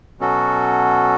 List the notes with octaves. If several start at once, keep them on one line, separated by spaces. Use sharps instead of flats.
B2 F#3 C#4 F#4 A4